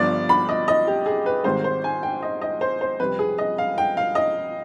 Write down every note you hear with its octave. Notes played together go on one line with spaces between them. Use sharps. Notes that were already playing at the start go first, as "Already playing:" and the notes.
Already playing: G1 G2 F3 D5
B5
D#5
D#5
G4
G#4
B4
G#1 G#2 D#3 G3 C5
C5
G#5
G5
D#5
D#5
C5
C5
F2 C3 G3 B4
G#4
D#5
F5
G5
F5
D#5